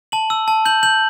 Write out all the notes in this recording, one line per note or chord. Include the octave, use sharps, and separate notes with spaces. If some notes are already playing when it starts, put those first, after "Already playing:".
A5 F#7
E6
A5
G6 F#7
G6 F#7